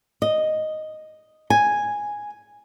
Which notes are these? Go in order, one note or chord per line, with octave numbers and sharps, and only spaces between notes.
D#5
G#5